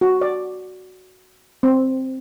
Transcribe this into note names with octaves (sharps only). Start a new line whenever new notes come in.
F#4
D5
C4